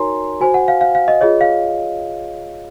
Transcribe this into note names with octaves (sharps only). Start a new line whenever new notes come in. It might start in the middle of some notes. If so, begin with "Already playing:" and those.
Already playing: D#4 F#4 A#4 C#5 G#5 A#5 C6
F#4 C5 G#5
F#5
F5
F5
F5
D#5
F4 G#4 C#5 D#5
F5